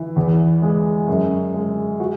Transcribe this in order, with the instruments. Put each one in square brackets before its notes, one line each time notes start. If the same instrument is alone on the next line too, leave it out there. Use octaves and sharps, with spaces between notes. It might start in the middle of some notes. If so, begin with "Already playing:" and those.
Already playing: [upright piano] E3
E2
G#3
F#2
G#3
F#4